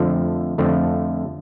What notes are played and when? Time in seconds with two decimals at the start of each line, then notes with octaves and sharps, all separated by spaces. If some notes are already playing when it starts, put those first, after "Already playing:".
Already playing: F2 D3 F3 A3
0.58 F2 D3 F3 A3